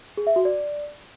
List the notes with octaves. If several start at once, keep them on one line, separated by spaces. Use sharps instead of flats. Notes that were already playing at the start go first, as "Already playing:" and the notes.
G#4
E5
F#4
D5